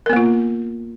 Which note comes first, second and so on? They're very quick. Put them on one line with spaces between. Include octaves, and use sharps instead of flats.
A#4 B3 A#3 F4